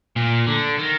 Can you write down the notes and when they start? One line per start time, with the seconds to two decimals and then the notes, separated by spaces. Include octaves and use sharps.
0.16 A#2
0.47 D3
0.78 D#3